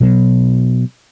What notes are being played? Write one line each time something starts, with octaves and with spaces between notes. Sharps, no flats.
B2 F#3